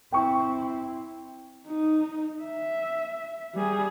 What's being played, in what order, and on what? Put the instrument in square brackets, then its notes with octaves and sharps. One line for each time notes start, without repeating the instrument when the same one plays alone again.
[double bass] C4 E4 [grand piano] G5 C#6
[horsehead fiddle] D#4
E5
G3 G#4